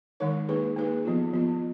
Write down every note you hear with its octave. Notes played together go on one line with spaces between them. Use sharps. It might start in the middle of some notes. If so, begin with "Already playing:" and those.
D#3 G#3 D#4 A#4 C#5
A#3 D#4 G#4 B4
A#3 D#4 G#4 B4
F3 B3 F4
F3 B3 F4